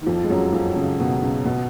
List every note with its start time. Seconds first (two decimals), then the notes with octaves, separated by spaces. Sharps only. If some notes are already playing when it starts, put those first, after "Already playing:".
0.02 D#3
0.06 F2 F3
0.23 G#3
0.30 F#2 F#3
0.53 F2 F3
0.76 C#3
0.99 B2
1.22 C#3
1.45 B2